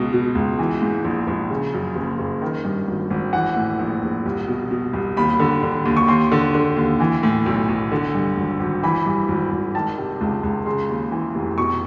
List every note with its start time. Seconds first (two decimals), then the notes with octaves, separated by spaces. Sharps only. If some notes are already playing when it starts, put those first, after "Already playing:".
Already playing: C#2 B2
0.13 B2
0.35 C#2
0.59 E3
0.82 G#2
1.04 A#1
1.27 A#1
1.50 C#3
1.74 F#2
1.96 F#1
2.19 F#1
2.42 D#3
2.65 G2
2.87 G#1
3.10 G#1
3.33 E3 F#5
3.56 A2
3.79 A#1
4.03 A#1
4.26 C2
4.48 B2
4.71 B2
4.93 C2
5.17 D#2 B5
5.39 D3
5.63 D3
5.85 D#2
5.97 C#6
6.08 D#2 C6
6.32 D3
6.55 D3
6.76 D#2
7.00 E3
7.23 A2
7.46 B1
7.69 B1
7.91 D3
8.15 G2
8.37 G#1
8.59 G#1
8.83 E3 B5
9.06 G2
9.28 G#1
9.52 G#1
9.75 D#3 A5
9.98 C3
10.21 C#2
10.43 C#2
10.66 C#3 C6
10.89 D#2
11.11 E3
11.35 F1
11.58 B2 C#6